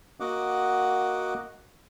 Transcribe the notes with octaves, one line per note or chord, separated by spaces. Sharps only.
A#3 F#4 D#5 F#5 D6